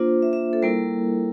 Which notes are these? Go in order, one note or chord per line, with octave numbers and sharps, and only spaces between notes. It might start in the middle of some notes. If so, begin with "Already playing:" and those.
Already playing: A#3 D4 F4 C5
E5
E5
A4
G3 A#3 E4 A#4